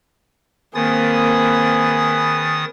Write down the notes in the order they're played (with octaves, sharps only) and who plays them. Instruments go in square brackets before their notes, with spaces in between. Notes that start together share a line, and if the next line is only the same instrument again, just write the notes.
[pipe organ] D#3 D#6 A6 [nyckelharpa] A#3 C4 [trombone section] G#4 B4